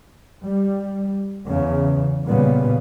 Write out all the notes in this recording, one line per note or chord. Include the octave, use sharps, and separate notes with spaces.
G3
E2 C#3
A#2 C#3 G3 B3